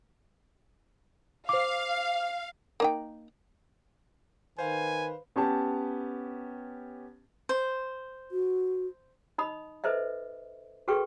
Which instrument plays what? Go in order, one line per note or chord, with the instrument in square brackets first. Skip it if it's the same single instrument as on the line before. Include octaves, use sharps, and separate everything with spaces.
[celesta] C5 D6 [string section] F5
[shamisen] A#3 D#4 G5
[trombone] D#3 [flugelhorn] B4 [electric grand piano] C5 F5 [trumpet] G#5
[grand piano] B3 C#4 G4 A5
[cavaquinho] C5
[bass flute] F#4
[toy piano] D#4 D#5 B5 D#6
A4 B4 C5 D#5 E5
F#4 G#4 A4 B4 G5 C#6